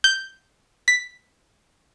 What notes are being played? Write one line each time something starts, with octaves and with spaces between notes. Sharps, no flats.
G6
B6